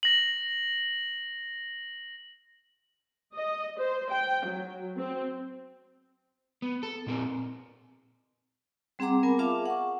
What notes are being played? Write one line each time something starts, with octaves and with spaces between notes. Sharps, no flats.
A#6 F#7
D#5
C5
G5
F#3
C4
B3
A4
A#2 C4 A#4
G3 C4 G#4 F#5 A#5 D6
B3 A#4 G#5
F4 G#4 E5 F5 A5 D6
F#5 C#6